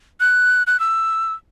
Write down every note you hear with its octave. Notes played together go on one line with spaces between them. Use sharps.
F#6
F#6
E6